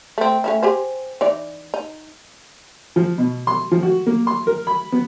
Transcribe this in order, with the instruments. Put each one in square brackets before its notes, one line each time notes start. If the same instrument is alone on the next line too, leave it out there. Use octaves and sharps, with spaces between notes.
[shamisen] A3 C4
A3 C#4 E4
G4 G#4 C5
E3 D#4 D5
D#4
[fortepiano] F3
B2
C6
F3
F#4
A#3
C6
A#4
B5
B3